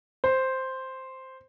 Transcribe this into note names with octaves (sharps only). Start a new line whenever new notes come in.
C5